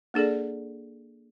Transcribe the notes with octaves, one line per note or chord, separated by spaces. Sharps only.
A#3 D4 G#4 A4 D5